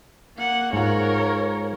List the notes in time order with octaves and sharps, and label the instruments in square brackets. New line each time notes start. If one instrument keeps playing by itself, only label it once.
[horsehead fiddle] A#3 F#5
[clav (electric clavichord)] G#2 F4 [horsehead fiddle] A#4 C#5